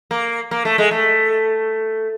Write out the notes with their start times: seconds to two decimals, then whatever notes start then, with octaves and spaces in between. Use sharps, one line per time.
0.11 A#3
0.51 A#3
0.65 A3
0.78 G#3
0.91 A3